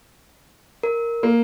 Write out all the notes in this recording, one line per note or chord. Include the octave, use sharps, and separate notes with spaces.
A#4
A#3